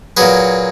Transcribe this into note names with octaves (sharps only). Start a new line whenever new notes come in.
A#2 F#3 G#4 B4